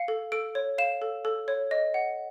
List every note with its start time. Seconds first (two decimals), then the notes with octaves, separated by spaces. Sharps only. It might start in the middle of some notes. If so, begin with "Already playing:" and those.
Already playing: F5 C#7
0.08 A4
0.32 A4 D7
0.55 C#5
0.78 F5 E7
1.02 A4
1.25 A4
1.48 C#5
1.71 D#5
1.94 F#5